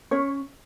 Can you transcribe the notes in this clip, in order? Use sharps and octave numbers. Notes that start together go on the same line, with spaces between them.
C#4 C#5